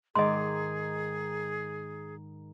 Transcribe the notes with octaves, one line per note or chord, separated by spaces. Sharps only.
G#2 D#3 G#4 D#5 C6 D6